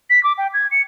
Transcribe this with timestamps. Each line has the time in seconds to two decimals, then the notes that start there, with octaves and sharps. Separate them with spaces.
0.10 B6
0.23 D6
0.38 G5
0.54 G#6
0.71 C#7